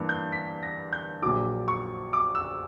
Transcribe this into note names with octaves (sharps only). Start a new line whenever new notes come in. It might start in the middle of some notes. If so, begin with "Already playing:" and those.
Already playing: G2 E3 A#3 D4
G6
B6
A#6
G6
A#1 A#2 F#3 D6
C#6
D6
E6